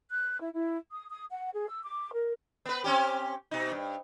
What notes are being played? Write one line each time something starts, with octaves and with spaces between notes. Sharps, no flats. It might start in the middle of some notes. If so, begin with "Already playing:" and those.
F#6
E4
E4
D#6
D#6
F#5
G#4
E6
D6
A#4
B3 B4
C4 C#4 G4
B2 D#4
G2